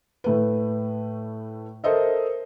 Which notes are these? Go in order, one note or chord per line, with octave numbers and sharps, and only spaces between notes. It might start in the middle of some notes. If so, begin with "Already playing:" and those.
A2 A3 B4
A4 A#4 C5 D#5 E5